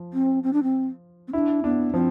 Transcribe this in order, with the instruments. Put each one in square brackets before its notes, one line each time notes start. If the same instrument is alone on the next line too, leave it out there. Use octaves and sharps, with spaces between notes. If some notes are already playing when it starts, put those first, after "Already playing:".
Already playing: [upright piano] F3
[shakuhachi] C4
C4
D4
C4
C4
[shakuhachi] D4 [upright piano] E4
[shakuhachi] B3 [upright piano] D4
[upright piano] F3 [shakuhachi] C4